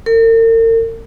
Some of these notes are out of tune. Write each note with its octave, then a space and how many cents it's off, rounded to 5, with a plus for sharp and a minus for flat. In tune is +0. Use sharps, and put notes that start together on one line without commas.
A#4 -45